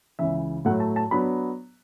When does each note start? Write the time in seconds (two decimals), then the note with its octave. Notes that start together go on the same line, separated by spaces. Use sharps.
0.19 C#2 C#3 E3 E5
0.65 A2 F#3 A3 F#5
0.80 A5
0.96 A5
1.11 F#3 B3 D4 B5